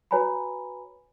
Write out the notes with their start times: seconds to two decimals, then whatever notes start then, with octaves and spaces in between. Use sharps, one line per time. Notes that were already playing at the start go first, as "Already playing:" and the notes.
0.11 F#4 B4 C#5 G#5 A#5 B5